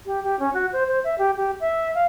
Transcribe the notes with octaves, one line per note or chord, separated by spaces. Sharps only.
G4
G4
C#4
F#4
C5
C5
E5
G4
G4
E5
F5